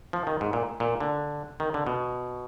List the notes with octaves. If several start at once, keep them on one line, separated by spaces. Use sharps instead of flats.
F3
D#3
G#2
A#2
A#2
D3
D#3
D3
B2